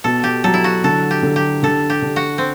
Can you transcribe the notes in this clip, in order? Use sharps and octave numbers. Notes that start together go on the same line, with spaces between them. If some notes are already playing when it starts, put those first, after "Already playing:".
B2 A4
G4
F#3 A4
E4
F#4
D3 A4
G4
D3
G4
D3 A4
G4
D3
F#4
C4